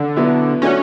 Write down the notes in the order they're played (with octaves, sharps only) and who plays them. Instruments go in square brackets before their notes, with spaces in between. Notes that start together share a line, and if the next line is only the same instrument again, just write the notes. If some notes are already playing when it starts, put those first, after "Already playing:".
Already playing: [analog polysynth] D3
[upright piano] B2 F#3 B3 E4
[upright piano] F#3 A3 D4 F#4 [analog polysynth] C#4